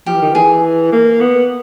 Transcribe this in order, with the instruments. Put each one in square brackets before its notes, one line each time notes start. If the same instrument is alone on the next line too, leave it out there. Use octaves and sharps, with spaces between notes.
[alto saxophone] F3 [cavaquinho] G4
[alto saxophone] E3
D#3
E3
[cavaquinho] G#4
[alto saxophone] A#3
B3